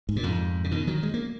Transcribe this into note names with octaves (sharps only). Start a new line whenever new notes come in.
G#2
A#2
F2 G#2
C#3
B2 D#3
D#3 F#3
G#3
A#3